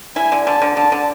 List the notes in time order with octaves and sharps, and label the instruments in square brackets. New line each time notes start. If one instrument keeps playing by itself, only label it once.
[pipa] E4 [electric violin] G#5
[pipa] D3
[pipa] D3 [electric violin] A5
[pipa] D3
[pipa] D3 [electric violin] A5
[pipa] D3